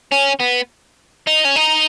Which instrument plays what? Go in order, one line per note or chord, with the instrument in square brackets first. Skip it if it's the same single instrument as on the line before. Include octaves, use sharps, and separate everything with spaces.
[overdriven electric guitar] C#4
B3
D#4
C#4
D#4